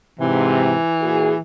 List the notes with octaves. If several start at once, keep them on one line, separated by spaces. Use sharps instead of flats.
G#2 C3 E3
A#2 F#4 G#4